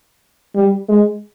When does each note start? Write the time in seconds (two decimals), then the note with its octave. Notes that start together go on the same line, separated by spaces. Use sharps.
0.55 G3
0.89 G#3